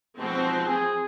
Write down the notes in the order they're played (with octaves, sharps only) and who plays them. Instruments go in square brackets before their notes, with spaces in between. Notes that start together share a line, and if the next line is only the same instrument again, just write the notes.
[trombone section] G#2 B2 [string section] F3 C4
[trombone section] G#4